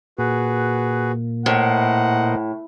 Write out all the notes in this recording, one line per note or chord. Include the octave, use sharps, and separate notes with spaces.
A#2 F#4 G#4 B4
A2 A#4 C5 D#5 F#5